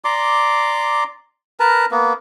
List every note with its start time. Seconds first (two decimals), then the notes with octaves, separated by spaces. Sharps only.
0.04 D5 A#5 C6 D6
1.60 A#4 B4 A5 A#5
1.91 A#3 B3